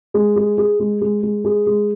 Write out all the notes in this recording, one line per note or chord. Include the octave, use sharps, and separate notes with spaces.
G#3
G#4
G#4
G#3
G#3
G#3
G#4
G#3